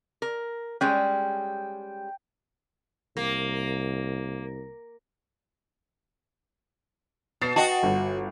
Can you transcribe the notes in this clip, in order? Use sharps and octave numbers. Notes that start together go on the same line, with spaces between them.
A#4
G3 G#3 C#4 G5
C2 A#3
B2 A6 C7 E7
F#4 D#5 G5 A5
G1